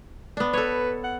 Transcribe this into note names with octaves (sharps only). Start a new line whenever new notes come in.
B3 D4
A4 B4 C#5
F#5